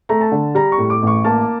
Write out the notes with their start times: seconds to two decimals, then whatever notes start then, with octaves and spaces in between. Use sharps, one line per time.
0.09 A3 A#5
0.21 A5
0.32 D3
0.55 G3 A#5
0.72 C#6
0.78 A2
0.90 D6
1.02 A1 C#6
1.24 A#3 A5